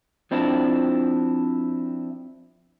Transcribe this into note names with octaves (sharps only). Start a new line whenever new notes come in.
F3 C4 D4 E4